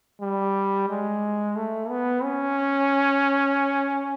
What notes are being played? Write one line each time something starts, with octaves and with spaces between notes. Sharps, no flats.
G3
G#3
A3
B3
C#4